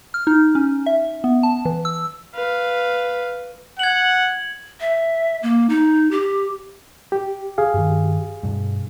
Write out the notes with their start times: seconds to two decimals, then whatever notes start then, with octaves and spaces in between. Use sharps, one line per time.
0.14 F6
0.27 D#4
0.55 C#4
0.86 E5
1.24 B3
1.43 A5
1.65 E3
1.85 E6
2.34 B4 F5
3.79 F#5 G#6 F#7
4.81 E5
5.43 A#3
5.69 D#4
6.11 G4
7.12 G4
7.58 G#4 F5
7.74 G2 D#3
8.43 G2 B2